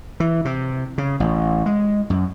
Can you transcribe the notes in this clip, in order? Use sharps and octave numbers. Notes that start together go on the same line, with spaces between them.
E3
C3
C#3
A1
G#3
F#2